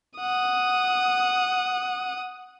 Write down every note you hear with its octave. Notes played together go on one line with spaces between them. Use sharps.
F#5 D#6